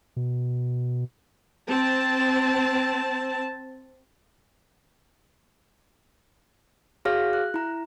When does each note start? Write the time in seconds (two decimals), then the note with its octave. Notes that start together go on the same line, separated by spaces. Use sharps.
0.16 B2
1.69 C4 A5
7.05 F#4 G#4 C#5 F5 F6 A#6
7.33 F#6
7.54 E4 A#5